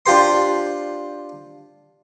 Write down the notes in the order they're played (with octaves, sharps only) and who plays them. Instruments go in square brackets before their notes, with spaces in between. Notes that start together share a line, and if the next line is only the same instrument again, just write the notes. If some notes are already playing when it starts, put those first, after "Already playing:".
[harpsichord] D4 F4 G4 C5 C6